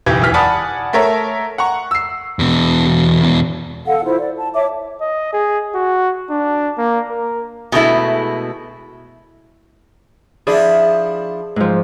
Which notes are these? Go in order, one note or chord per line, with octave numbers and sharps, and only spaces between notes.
F#1 B1 E3 G4 G#6
E1 E3 F6 B6
D5 F#5 G#5 A5 B5 D#6
A3 A4 A#4 C#5 E5
F#5 A#5 C#6
E6 C7
E2 B2
A4 F5 F#5
E4 F4 C5
D5
A5
C#5 E5 A5 D6
D#5
G#4
F#4
D4
A#3
A#4
B2 G#3 A3 E4
F3 D4 E4 G#4 D5
G#2 F3